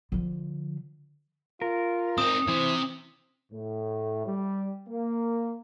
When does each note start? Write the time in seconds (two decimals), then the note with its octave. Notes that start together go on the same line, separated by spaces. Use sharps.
0.12 D3 F3
1.62 F4 A#4
2.18 C4 D#4 D#6
2.48 C3 E3 E4 C5
3.52 A2
4.26 G3
4.87 A#3